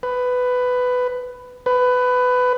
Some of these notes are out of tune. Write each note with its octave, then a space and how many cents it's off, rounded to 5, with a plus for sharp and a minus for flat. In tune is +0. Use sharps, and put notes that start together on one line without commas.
B4 +15
B4 +20